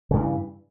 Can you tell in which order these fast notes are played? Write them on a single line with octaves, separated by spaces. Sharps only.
C#3 G2 E3